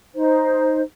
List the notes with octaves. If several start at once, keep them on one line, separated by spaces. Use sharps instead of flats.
D#4 C5